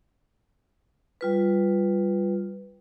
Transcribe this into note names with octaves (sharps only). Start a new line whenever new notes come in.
G3 F4 B4